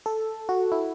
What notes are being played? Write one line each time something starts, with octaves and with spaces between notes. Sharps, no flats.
A4
F#4
E4